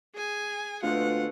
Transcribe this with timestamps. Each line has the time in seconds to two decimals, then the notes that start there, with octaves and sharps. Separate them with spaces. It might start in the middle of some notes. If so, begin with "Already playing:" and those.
0.15 G#4 G#5
0.83 D2 B2 G#3 A3 F4 F#5